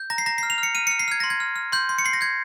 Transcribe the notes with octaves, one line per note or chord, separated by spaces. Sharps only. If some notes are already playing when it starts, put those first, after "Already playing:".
Already playing: G6
A#5 A#6
C7
A#5 A#6
F6 C7
F7
F6
C#7
F6 D#7
F6 C#7
C7
F6 G#6
C6 A#6
G#6
F6
F6
C6 G6
C6
C#7
C6 C7
A#6
G6 G#6